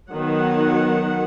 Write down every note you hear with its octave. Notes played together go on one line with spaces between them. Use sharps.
D#3 F#3 B3 F#5